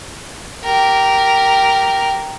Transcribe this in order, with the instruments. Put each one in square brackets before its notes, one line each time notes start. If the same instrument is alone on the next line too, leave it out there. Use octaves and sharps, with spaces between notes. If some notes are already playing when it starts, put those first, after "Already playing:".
[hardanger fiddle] G4 A#4